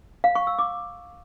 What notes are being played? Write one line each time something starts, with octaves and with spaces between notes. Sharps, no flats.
F5
C#6
E6
D6